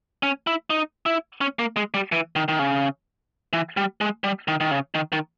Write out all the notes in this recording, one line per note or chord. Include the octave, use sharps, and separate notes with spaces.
C#4
E4
D#4
E4
C#4
A#3
G#3
G3
E3
D#3
D#3
C#3
E3
G3
G#3
G3
D#3
D#3
C#3
D#3
D#3